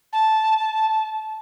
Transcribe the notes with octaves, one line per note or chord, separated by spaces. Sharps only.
A5